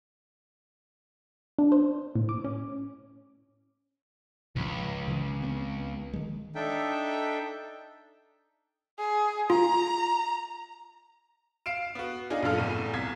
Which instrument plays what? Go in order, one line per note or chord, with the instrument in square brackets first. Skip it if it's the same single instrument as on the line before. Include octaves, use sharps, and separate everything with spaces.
[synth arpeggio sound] D4
C5
A2
D6
C#4
[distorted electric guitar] C#2 [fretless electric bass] G#2 F3 C#4
[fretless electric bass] C#3 E3
B3 C4
D#3 G#3
[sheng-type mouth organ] D4 D#4 A4 E5 G5
[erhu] G#4
[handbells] F4 [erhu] A#5
[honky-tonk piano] F5 C7 D7 E7
B3 F#4
D4 D#4 F4 G#4
A#1 F#2 F4 A4 F6
F1 E2 A2 D#7
C2 G#6 B6